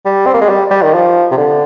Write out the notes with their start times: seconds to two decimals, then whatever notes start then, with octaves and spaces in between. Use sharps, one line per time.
0.05 G3
0.26 C4
0.34 A#3
0.41 G#3
0.49 G3
0.71 G3
0.82 D#3
0.94 F3
1.31 C3
1.37 D3